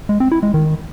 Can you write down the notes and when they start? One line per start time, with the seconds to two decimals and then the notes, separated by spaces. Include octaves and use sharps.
0.09 G#3
0.20 C4
0.32 E4
0.43 G#3
0.54 D#3